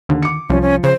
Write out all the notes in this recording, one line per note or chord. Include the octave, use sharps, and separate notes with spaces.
D#2 D3
D6 C#7
C2 F3 C#4
C#4
C#3 C5